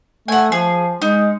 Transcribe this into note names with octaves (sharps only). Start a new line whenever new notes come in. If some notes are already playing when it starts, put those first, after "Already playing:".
A3 F#5 G#5
F3 G#4
G#3 D#4